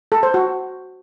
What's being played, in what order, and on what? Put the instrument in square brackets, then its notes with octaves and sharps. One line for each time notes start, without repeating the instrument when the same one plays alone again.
[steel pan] A4
C5
F#4